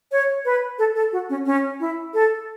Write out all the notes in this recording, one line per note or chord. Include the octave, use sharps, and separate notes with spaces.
C#5
B4
A4
A4
F#4
C#4
C#4
E4
A4